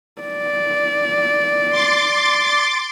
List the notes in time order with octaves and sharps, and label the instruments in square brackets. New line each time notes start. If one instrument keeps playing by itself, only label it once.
[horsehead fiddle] D5
[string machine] C6 D6 A6